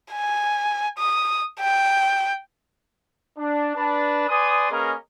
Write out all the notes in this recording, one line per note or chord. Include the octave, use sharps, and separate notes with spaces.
G#5
D#6
G5
D4
D4 B4 A5
B4 D5 G#5 C6 D#6
A#3 C#4 G#4 A#4 B4 D#5